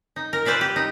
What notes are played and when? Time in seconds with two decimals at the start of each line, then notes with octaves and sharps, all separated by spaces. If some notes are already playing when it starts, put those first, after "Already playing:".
0.16 D#4
0.33 A#4
0.45 B4 C5 D5 E5 F5
0.61 G4
0.76 D#4